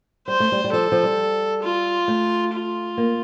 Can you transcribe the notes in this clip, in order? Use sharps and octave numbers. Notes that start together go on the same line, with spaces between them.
G3 C5
A3
G3
G3
F3 A4
F3
G3
F4
A3
F4
A#3